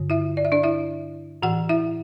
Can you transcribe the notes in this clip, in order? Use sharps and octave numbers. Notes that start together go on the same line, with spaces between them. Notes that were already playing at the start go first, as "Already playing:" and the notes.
Already playing: G2 D3
E4 E5
D5
E5
D4 D5
E4 E5
A2 E3 F#4 F#5
E4 E5